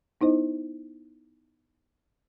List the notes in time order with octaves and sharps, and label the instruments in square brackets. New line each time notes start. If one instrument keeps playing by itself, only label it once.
[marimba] B3 D#4 E4 C5 D#5